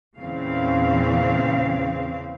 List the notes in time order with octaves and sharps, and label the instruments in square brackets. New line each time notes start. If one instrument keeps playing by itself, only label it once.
[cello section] E2 A#2 C#3 E3 C4 F5